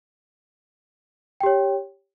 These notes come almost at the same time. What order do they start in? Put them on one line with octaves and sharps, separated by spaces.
G5 G4 C#5